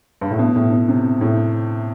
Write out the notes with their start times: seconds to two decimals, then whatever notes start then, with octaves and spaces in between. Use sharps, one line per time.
0.21 G2
0.31 A2
0.39 B2
0.56 A2
0.72 B2
0.89 C3
1.21 A2